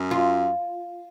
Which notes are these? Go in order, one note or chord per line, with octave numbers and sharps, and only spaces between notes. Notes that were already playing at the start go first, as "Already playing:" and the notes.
Already playing: F#2
F4